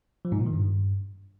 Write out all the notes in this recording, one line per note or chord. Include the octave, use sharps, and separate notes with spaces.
F3
G#2
A#2
D#3
G2